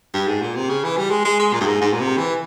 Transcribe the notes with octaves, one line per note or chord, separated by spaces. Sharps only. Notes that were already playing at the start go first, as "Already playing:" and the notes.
G2
G#2
A#2
C3
C#3
E3
G3
G#3
G#3
G#3
A#2
G2
G#2
G#2
A#2
C3
E3